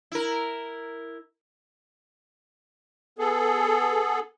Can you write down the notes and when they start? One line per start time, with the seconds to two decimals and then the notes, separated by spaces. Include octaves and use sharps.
0.12 E4 A#4
3.19 B3 G#4 A4